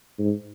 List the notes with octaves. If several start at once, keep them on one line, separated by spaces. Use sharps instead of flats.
G#2